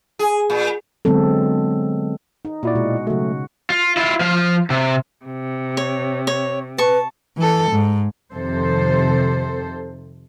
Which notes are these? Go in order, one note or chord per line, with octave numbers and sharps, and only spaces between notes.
G#4
A#2
D3 F#3 G#3 B3 C4 A4
D#4
A#2 E4 F#4 D5
B2 G#3
C#3 F#3 A3 F#4
F4
E4 F4
F3 F5
C3
C3
C#5
C#5
B4 A5 C#6
E3 A4
G#2
F2 C3 D#3 A4 C5